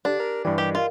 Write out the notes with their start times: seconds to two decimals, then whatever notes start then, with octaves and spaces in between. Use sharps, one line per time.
0.05 D3 D4 G4
0.20 A#4
0.45 G2 E3 G4 D5
0.58 D#3 G4
0.75 F4 A#4 D#5 F5